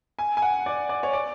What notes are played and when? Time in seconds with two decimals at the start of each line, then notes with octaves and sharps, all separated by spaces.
0.19 G#5
0.37 G#5
0.42 F#5
0.66 D5
0.89 D5
1.03 C#5
1.13 D5